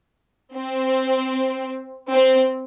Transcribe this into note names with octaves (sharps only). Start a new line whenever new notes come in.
C4
C4